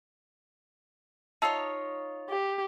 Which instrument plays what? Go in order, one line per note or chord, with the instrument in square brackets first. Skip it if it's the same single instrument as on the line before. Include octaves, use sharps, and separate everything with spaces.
[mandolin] D#4 F4 C#5 [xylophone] A5 E6
[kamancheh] G4